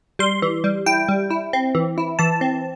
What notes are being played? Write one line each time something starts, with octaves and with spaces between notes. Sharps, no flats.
G3 C6
E3
G3
E4 G5
G3
E4
C4
E3
E4
E3 A5
C4